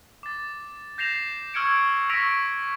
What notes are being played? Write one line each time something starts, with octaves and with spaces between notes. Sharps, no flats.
D6 A6
G6 A#6 C7 E7 F7
C#6 E6 F6 G#6 C#7 D7
C#6 E6 A#6 B6 D7 F7